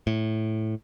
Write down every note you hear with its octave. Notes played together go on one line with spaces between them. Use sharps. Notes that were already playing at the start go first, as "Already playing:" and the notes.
A2